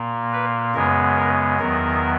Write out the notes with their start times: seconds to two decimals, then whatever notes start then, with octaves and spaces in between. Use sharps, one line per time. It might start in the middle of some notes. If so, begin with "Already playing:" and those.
Already playing: A#2 A#3
0.33 B4
0.74 F#2 C#3 G#3 B3 A#4
1.16 A#4
1.59 E2 D#3 F#3 B3 A#4